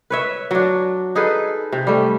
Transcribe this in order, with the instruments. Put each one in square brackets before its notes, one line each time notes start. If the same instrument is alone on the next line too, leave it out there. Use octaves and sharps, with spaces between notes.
[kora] B4 C#5 E5
F#3 D4
D#4 G#4 A4 B4
C3
G3 A3